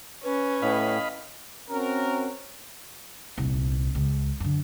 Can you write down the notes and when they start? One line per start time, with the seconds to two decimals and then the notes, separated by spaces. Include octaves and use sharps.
0.23 C#4 B4
0.62 A2 D#5 F5 B5
1.71 C4 C#4 F#4 A#4
3.38 D#1 C2
3.95 C#2
4.40 F#2 D3